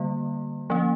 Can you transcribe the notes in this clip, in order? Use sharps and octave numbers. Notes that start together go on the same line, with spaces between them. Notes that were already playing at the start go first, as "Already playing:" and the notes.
Already playing: D3 G3 A#3
F3 A#3 C#4